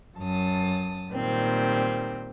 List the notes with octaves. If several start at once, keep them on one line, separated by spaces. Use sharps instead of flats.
F#2 A5 D#6
A#2 D#3 G3 C4